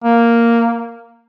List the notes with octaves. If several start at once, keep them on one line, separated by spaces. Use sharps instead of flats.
A#3